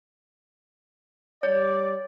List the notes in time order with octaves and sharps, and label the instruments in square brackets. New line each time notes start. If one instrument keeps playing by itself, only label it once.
[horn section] G3 D5 [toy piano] C#5